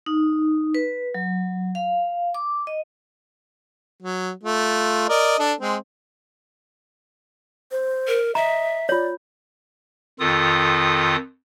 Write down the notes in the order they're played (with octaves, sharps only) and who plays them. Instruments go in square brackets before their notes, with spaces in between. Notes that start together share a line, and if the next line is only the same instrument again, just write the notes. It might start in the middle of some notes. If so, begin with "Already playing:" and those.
[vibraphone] D#4
B4
F#3
F5
D6
D#5
[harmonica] F#3
A3 F4
A#4 D5 D#5
D4 A4
G#3 C4
[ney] C5
[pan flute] A#4
[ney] D#5 [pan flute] E5 [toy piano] A#5
[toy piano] F4 C#5 [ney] D5
[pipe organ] F2 D#3 F4 A4 D#6